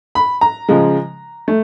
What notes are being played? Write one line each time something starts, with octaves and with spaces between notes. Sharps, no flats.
B5
A#5
C#3 F3 G#3
A3